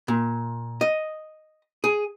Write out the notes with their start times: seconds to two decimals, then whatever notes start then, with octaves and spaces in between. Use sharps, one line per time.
0.08 A#2
0.81 D#5
1.84 G#4